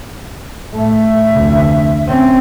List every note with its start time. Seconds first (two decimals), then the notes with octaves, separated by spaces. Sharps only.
0.73 A2 A3 E5
1.31 F1 D2
2.07 C4 C#4